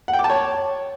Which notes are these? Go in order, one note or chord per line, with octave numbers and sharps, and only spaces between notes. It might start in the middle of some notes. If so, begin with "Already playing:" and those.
F#5
G5
D6
A5
C#5